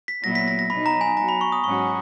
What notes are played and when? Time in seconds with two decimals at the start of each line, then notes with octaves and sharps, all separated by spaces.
0.08 B6
0.24 A#2 F#3 B3 E4 A#6
0.35 B6
0.48 A#6
0.59 A#6
0.70 B2 F#3 B3 D#4 B5
0.86 A#5
1.01 G#5
1.17 F#3 B3 F#4 A#5
1.28 B5
1.41 C#6
1.52 D#6
1.64 G#2 F#3 C#4 F#4 C#6